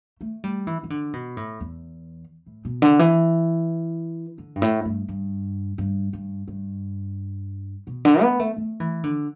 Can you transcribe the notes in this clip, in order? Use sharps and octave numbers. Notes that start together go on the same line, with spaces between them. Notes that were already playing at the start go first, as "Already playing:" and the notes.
A3
G3
E3
E3
D3
B2
A2
E2
A2
B2
D3
E3
D3
G2
A2
G2
G2
G2
G2
G2
B2
D3
B3
A3
A3
E3
D3